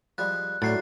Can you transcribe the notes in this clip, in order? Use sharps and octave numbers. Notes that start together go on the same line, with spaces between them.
F3 G3 G#3 F#6
A2 F#3 A3 D4 A6 C7